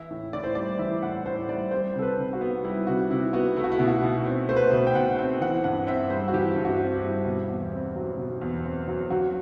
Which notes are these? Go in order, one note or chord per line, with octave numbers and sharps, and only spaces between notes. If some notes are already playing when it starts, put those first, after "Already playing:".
Already playing: E3 E4
A2
A2 D5
C5
G3 D5
E3 E5
A2 F#5
A2 C5
G3 D5
G3 C5
C3 A4
B4
C3
F#4
B3
G3 E4
C3 F#4
C3 E4
B3 F#4
A3 E4
F#4
E4
B2
F#4
B2
C4
A3 C5
B4
C5
B2
G5
B2 F#5
C4
E3 F#5
G2 F#5
C4 E5
G3 C5
F#4
E3 G4
G2
F#4
C4
E4
G3
B2
E2
C4
F#3
B2
E2
C4
F#3
F#3 F#4